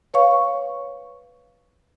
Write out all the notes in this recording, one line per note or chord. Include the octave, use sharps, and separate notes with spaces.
B4 C#5 F5 C#6